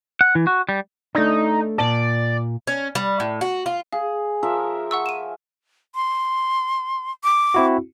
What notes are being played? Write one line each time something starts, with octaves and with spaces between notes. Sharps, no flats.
F#5
E3
F#4
G3
A3 D4 D#4
A#2 D5 A5
C#4
G3
A2
F#4
F4
G#4 F5
F3 A#4 E5
F#5 C#6 E6
D#7 E7
C6
D6
C4 E4 F#4